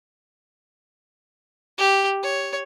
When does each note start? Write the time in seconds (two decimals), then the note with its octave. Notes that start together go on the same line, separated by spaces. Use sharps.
1.78 G4
2.23 C#5